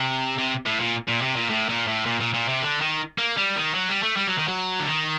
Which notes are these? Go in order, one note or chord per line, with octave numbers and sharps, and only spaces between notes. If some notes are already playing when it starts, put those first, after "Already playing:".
Already playing: C3
C3
A2
A#2
A#2
C3
A#2
A2
A#2
A2
A#2
A#2
A#2
C3
D3
D#3
A#3
G3
D#3
F#3
G3
A3
G3
F#3
D#3
F#3
D3
D#3